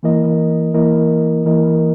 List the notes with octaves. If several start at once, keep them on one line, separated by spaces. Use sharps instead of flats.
E3 A#3 E4 A#4 D#5
E3 A#3 E4 A#4 D#5
E3 A#3 E4 A#4 D#5